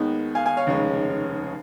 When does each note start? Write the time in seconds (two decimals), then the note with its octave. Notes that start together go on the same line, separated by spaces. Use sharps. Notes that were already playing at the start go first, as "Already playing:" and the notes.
Already playing: D#2 D#3 G#3 B3
0.35 F5 G#5
0.46 F5 G#5
0.57 C#5 F5
0.67 F1 D#2 C#3 G#3 C#4